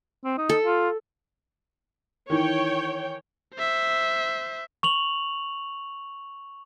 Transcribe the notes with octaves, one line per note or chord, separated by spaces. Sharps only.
C4
D#4
A4
F4
D#3 E3 C#5 G5
C5 E5
C#6 F7 F#7